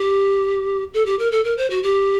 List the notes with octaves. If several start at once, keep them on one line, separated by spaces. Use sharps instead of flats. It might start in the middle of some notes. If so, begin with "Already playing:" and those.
Already playing: G4
A4
G4
A#4
A4
A#4
C5
F#4
G4